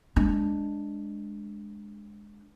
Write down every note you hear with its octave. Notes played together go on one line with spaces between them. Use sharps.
G#3 D4